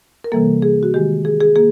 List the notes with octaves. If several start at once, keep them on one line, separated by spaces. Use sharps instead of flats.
A#4
C3 E3 G3 A#3 A4
G#4
F#4
D#3 G#3 G4
G#4
G#4
A#3 G#4